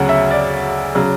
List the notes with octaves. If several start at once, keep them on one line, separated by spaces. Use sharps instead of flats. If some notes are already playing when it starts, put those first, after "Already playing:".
Already playing: D2 C#3 F#3 F#5
E5
D5
C#3 F#3